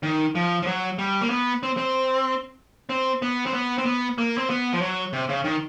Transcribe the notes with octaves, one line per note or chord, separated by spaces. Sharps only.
D#3
F3
F3
F#3
G3
A#3
B3
C4
C4
C4
B3
C4
B3
C4
B3
A#3
C4
B3
F3
F#3
C3
C#3
D#3